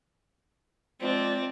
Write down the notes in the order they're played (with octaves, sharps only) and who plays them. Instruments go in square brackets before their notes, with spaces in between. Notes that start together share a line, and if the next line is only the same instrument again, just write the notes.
[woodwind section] F3 G#3 D5 [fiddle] C4